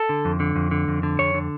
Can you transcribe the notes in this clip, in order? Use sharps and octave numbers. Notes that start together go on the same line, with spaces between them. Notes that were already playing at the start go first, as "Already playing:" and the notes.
Already playing: A4
D3
F2
D3
F2
D3
F2
D3
F2 C#5
D3